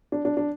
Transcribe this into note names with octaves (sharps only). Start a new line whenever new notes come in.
D4
D4
D4